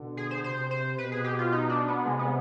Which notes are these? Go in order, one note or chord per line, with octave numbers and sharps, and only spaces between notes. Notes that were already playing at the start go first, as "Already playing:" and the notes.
Already playing: B2 D3
G#4
C5
C3 C5
C5
B2 B4
G#4
G4
F4
D#4
D4
B3
C3 G#3
B3